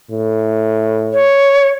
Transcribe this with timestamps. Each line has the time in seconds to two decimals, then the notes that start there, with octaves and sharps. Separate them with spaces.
0.11 A2
1.13 C#5